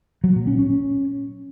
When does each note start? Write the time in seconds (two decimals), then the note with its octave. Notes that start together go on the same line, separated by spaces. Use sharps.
0.24 F#3
0.35 A#2
0.47 C#4
0.59 C#4